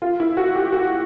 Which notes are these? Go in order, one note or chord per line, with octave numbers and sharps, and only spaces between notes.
F4
E4
F#4
G4
F#4